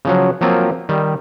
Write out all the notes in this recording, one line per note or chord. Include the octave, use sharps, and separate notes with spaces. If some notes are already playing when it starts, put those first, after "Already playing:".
C#3 F3 F#3
F3 F#3 A#3 C4 F4
D#3 G3